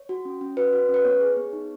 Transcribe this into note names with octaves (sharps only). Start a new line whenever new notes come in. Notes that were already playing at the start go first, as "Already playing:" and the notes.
Already playing: C#5
F#4
C#4
C#4
F#4 B4
F#4
C#4
B4
B3 C#5
G#4
B3
D#4